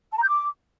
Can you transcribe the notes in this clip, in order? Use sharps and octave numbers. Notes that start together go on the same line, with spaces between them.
A5
A#5
G6
D6